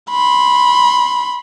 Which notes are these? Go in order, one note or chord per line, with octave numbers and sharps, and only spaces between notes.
B5 C6